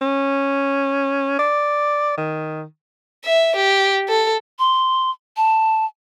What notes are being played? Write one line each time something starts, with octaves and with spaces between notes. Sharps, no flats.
C#4
D5
D#3
E5
G4
A4
C6
A5